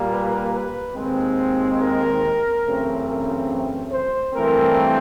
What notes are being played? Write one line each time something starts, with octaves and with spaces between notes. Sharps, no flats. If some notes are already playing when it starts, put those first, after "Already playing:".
Already playing: A#2 G3 A#3
B4
B4
D#2 D#3 G#3 C4
A#4
F#2 C#3 E3 A3 C4
A#4
C5
G2 E3 A3 C4 A#4